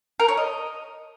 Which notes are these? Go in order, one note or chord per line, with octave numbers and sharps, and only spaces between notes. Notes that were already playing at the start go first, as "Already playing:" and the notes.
A#4
C#5
D#5